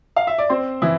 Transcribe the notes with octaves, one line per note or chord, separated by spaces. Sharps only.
F5
E5
D5
C4 C5
E3 E4